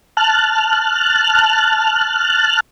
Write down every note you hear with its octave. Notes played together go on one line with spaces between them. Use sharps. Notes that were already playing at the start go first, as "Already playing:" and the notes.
A5 F6 F#6